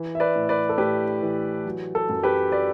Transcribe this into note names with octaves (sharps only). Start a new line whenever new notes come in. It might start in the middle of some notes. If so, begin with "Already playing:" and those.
Already playing: E3
E5
B4 D5
A2
B4 D5
A4
A2 G4 B4
E3
F#3
A4
F#2
G4 B4
B4 D5